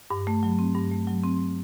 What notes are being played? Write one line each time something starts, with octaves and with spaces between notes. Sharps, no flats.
G2
A3
F#3
C4
G2
A3
F#3
C4